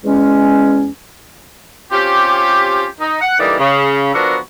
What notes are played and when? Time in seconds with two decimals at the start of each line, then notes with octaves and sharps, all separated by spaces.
0.05 E2 G#3 C#4
1.91 C4 C#4 F4 G4
3.00 D#4
3.21 F#5
3.39 D3 E3 G3 A#3 D#4 D5
3.58 C#3
4.13 F3 B3 D4 F#4 A4 A#4